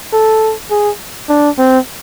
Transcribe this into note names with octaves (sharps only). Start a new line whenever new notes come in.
A4
G#4
D4
C4